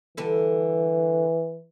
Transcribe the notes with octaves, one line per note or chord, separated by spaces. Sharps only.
D3 E3 G3 A4